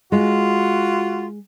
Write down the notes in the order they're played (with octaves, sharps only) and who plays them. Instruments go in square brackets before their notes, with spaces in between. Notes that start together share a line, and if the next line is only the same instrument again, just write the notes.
[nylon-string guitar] G#3 [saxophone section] F4 F#4